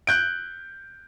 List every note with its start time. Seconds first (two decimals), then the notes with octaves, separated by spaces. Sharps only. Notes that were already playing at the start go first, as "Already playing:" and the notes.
0.07 F#6 G6 D7